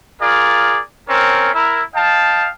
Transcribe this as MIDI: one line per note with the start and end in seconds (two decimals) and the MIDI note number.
0.21 0.81 65
0.21 0.81 68
0.21 0.81 70
0.21 0.81 74
1.09 1.52 60
1.09 1.52 61
1.09 1.52 70
1.54 1.82 64
1.54 1.82 70
1.95 2.49 75
1.95 2.49 77
1.95 2.49 79
1.95 2.49 81